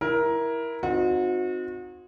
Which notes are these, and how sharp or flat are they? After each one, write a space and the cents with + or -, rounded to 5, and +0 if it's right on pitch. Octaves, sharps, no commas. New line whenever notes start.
E4 +0 A#4 +15
C4 -10 D#4 +0 F#4 -35